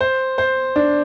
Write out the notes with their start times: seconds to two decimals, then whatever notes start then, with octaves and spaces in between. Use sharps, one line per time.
0.01 C5
0.38 C5
0.76 D4